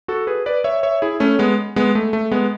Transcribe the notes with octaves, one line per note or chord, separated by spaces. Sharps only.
F#4 A4
G#4 B4
B4 D5
C#5 E5
C#5 E5
E4 G#4
A3 C#4
G#3 B3
G#3 B3
A3
A3
G#3 B3